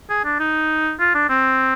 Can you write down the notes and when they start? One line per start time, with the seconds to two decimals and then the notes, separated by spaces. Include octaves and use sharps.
0.10 G#4
0.25 D4
0.40 D#4
1.00 F4
1.15 D4
1.30 C4